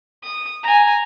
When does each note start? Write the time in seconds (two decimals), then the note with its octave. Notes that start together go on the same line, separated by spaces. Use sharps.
0.23 D#6
0.63 G#5 A#5